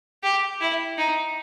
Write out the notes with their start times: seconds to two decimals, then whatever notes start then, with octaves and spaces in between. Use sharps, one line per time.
0.23 G4
0.61 E4
0.98 D#4